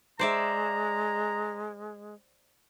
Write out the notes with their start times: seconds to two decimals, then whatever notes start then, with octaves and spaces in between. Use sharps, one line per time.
0.19 G#3 C5 D5 E5 A#5